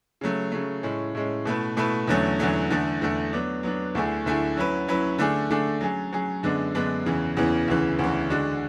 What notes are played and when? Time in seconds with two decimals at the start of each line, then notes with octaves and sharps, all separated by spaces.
0.21 C#3 F#3 A3
0.52 C#3 F#3 A3
0.83 A2 G#3 C#4
1.15 A2 G#3 C#4
1.45 B2 A3 E4 B4
1.77 B2 A3 E4 B4
2.08 E2 D3 F#3 A3 C#4
2.39 E2 D3 F#3 A3 C#4
2.70 E2 D3 A3 E4 A4
3.01 E2 D3 A3 E4 A4
3.33 F#3 B3 D4
3.63 F#3 B3 D4
3.95 D2 D3 A3 E4 G#4
4.26 D2 D3 A3 E4 G#4
4.57 F#3 C#4 E4 B4
4.88 F#3 C#4 E4 B4
5.19 D3 A3 D4 G#4
5.50 D3 A3 D4 G#4
5.81 F#3 C#4 G#4
6.12 F#3 C#4 G#4
6.43 F#2 D3 G#3 B3 D4
6.75 F#2 D3 G#3 B3 D4
7.06 E2 C#3 E3 B3
7.37 E2 C#3 E3 B3
7.68 D2 C#3 E3
7.99 D2 C#3 E3
8.30 D3 G#3 D4 F#4